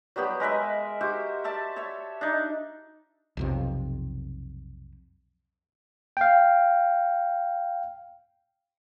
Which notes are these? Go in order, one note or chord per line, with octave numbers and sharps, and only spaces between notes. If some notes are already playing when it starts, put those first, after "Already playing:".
F#3 G3 B3 G4
G#3 A#4 B4 E5
F#4 G4 C5 E5
D5 E5 A5
A4 C#5 E5
D4 D#4
B1 F2 C3
F5 G5